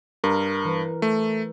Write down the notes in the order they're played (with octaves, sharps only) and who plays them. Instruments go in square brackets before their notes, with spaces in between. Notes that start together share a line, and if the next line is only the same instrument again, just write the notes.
[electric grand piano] G2 [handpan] A#4
[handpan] E3 B4
[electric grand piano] A3